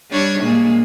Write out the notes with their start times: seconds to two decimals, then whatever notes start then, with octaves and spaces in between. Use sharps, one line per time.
0.11 G3 D4 C#5
0.41 A#2 G#3 A#3